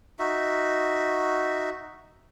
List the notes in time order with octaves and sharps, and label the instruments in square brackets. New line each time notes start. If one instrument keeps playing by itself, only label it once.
[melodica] D#4 F#4 E5